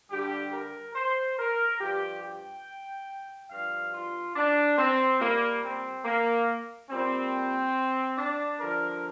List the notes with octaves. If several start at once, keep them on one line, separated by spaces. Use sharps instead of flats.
G2 D3 G3 G4
A#4
C5
A#4
G2 F3 G4
G5
G2 F3 F5
F4
D4
C4
A#2 G3 A#3
C4
A#3
A#2 G3 C4
D4
G2 D3 F3 A#4